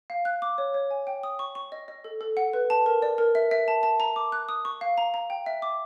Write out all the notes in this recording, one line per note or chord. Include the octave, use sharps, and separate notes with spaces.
F5
F#6
D6
C#5
C#5
G#5
G5
D#6
C#6
C#6
D#5
D#5
A4
A4
F#5
B4
A5
A#4
D5
A#4
E5
E5
A5
A5
A#5
D6
F#6
D#6
C#6
F5
A#5
A#5
G5
E5
D6